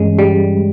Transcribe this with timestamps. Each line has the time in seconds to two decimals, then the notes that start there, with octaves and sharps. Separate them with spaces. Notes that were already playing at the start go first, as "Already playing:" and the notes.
Already playing: G2 E3 G#3 C#4
0.19 G3